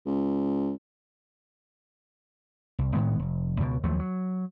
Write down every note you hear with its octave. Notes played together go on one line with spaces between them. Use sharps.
C#2
C2
A2 D#3 G#3 B3
F1
C#2 B2
D#2 F3 F#3 A3
F#3